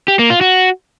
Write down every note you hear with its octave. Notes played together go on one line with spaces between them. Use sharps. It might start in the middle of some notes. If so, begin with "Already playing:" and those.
G4
A#3
F4
F#4